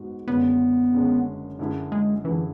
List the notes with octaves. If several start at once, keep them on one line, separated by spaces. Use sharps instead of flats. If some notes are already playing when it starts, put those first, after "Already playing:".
Already playing: G#2 G#3 B3 F#4
F#1 F#2 D3 G#3 B3 C#4
F#1 F#2 D3 G#3 C#4
F#2 D3 A3 E4 G#4
G#3
F#2 D3 E3 A3 E4 G#4